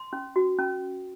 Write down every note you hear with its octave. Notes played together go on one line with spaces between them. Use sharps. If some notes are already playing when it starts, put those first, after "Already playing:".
Already playing: C6
C#4
F#4
C#4